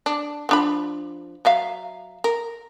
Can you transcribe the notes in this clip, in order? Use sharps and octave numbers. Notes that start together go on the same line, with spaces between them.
D4
F3 D4 B5
F#3 E5 F5
A#4